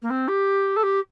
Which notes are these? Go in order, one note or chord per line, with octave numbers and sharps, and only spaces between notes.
A#3
C4
G4
A4
G4